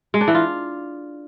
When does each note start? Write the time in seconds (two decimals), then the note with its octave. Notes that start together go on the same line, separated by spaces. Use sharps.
0.14 G#3
0.21 D4
0.28 E3
0.35 F4